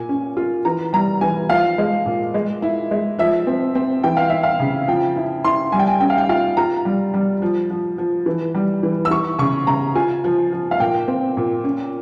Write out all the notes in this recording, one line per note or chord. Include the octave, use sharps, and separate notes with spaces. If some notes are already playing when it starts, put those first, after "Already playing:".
Already playing: A#2 G#5
C#4
F4
E3 A#5
G3 A#5
E3 G#5
F3 F5
G#3
A#2
G#3
E4
G#3
F3 E5
C4
C4
E3 G5
F5
E4 E5
F5
C#3
F3 G5
E4
E4 C6
G3 G#5
G5
G#5
C#4 G5
F5
G5
F4 F5
F4 A#5
G3
G3
F3
F3
F3
E3
G3
E3
E6
E3 C#6
C#3 C#6
C#3 A#5
F4 G#5
F3
F3
F5
A#2 G5
C4
A#2
C#4